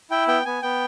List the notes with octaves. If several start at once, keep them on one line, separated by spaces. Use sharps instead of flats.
E4 G5
B3 G5
B3 G#5
B3 G5